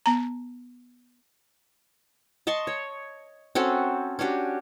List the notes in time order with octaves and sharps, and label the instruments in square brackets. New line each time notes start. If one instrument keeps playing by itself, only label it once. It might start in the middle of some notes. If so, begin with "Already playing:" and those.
[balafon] B3 A#5
[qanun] D#5 A5 C6 C#6
C#5
C4 C#4 F#4 A4
C#4 D4 F#4 G4